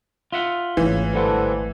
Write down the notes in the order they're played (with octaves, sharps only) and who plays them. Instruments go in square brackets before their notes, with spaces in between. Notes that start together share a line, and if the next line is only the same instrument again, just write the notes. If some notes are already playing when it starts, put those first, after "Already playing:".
[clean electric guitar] F4 E5 F#5
[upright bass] G#1 A3 [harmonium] C#3 [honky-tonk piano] E3
[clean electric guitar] G2 D3 F#5 [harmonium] A4 B4 C5